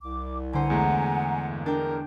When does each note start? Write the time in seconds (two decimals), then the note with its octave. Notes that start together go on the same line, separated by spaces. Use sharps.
0.01 C2 D6
0.53 D3 C5 F#5 G#5 A#5
0.70 E2 G#3 A3
1.50 G2 E3 A#3
1.66 D4 A#4 G5